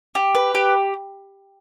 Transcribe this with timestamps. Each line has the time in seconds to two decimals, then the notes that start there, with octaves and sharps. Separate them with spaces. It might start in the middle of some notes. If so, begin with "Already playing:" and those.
0.15 G4
0.35 B4
0.55 G4